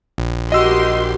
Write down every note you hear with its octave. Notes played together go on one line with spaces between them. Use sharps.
A#1
F#4 G4 A#4 D#5 C6 E6